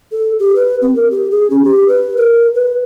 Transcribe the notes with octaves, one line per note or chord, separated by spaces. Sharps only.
A4
G4
B4
C4
A#4
G4
G#4
C#4
G4
B4
A#4
B4